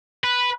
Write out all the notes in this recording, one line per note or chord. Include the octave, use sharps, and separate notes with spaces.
B4